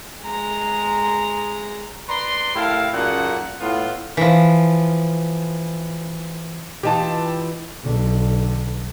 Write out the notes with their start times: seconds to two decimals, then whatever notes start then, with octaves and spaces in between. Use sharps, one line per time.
0.23 G#3 A#5
2.09 B4 D5 A#5 C6
2.56 A2 E4 G4 A#4 F5 A5
2.93 F#2 A#2 C#3 D#4 A4 F#5
3.60 A2 B3 F4
4.17 E3 F3
6.83 E3 D#4 F4 G4 A5
7.84 B1 D3